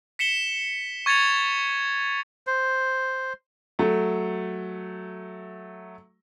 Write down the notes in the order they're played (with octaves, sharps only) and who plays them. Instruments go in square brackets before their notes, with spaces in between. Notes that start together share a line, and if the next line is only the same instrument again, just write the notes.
[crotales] B6 C#7 E7 G7
C#6 G#6 A6 C#7 F7
[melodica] C5
[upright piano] F#3 A3